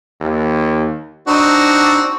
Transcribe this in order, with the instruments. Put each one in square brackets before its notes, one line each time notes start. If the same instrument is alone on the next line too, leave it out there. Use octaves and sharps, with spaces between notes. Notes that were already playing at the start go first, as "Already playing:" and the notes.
[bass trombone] D#2
[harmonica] C4 D#4 F#4 [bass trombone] D4